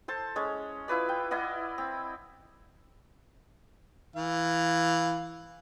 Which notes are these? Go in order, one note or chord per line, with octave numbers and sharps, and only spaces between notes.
A4 C5 A5
G#3 C#4 C#5
E4 F4 B4 D5
G5
E4 D5 D#5 F#5
C4
E3 F5